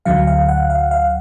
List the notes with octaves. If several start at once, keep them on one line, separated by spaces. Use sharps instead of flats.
D2 D3 F#3 F5
F5
F#5
F5
F5